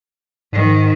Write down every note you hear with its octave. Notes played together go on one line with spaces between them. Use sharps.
G#2 D#3